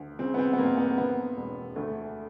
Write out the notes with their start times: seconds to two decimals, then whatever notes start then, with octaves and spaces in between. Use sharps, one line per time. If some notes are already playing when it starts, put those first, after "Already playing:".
Already playing: D2
0.19 C#3 C4
0.34 B3
0.39 C4
0.53 B3
0.58 G1 A#3
0.77 B3
0.98 D3 B3
1.37 E1
1.76 D2 A3